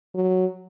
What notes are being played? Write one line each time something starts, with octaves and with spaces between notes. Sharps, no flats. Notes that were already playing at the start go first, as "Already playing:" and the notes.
F#3